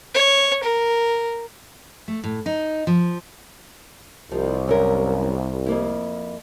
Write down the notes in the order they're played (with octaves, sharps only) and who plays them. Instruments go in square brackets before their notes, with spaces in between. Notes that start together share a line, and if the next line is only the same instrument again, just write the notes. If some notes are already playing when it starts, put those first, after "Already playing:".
[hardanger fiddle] C#5
A#4
[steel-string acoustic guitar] A3
A2
D#4
F3
[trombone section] C2 [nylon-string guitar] F3 D#4
[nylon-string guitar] F#2 C#4 A#4
F2 A#3 E4